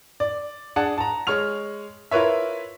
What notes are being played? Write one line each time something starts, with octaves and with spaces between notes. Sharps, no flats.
D5
D4 G#4 F#5 A5
A5 A#5
G#3 C#5 C#6 F6 F7
E4 F4 A#4 B4 C#5 E5